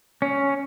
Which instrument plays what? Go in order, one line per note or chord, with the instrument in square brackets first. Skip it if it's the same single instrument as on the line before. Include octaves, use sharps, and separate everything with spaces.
[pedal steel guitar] C#4